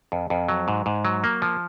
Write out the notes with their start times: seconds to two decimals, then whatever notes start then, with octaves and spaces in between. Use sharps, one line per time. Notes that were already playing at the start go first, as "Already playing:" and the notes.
0.12 F2
0.30 F2
0.49 F#3
0.68 G#2
0.86 G#2
1.05 F#3
1.24 A#3
1.42 F3